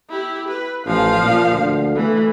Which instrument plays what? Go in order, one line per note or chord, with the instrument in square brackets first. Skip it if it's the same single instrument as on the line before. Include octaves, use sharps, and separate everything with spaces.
[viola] E4 G4
B4
[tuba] A1 [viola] F3 F5
[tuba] A#2
D2
[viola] E3 [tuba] A3